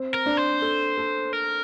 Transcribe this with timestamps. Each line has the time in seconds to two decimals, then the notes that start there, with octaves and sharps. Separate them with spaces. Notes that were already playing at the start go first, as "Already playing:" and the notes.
Already playing: C4
0.14 A#4
0.26 D4
0.37 C5
0.62 A4
0.97 A4
1.33 A#4